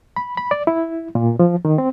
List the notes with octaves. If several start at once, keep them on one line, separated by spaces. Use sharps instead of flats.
B5
B5
D5
E4
A#2
F3
D#3
C4